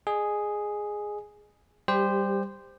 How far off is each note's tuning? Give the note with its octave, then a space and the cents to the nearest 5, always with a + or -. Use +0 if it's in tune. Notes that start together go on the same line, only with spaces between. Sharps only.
G#4 +0 D#5 -35
G3 +0 G4 +25 C5 -10